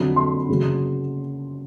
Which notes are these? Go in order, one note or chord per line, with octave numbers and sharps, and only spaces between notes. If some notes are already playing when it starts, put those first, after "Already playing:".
Already playing: F2 D3 F#3 B5
C6
F#2 C#3 F#3